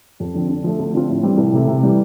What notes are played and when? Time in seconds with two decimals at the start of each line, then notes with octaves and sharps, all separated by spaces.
0.20 F2
0.34 D3 F3 C4
0.49 D3
0.64 F3 A3
0.79 D2
0.94 D3 F3 C4 F4
1.09 A2
1.23 E3 G3 C4
1.38 C2
1.53 C3 E3 A3 E4
1.67 C3
1.83 E3 G3